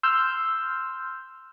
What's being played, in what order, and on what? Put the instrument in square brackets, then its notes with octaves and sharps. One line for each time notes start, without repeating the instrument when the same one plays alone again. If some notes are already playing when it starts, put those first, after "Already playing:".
[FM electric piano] C6 E6 F6 G6